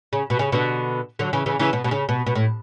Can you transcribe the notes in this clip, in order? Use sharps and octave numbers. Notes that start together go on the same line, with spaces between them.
C#3
B2
C#3
B2 D3
D3 F#3
C#3 E3
C#3 E3
C#3 E3
B2
B2
C#3
B2
B2
A2